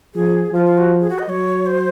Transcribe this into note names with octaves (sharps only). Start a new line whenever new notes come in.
F3 G#4
F3 F4
F4
F#4
G#4
F#4
D#5
F#3 C#5
C5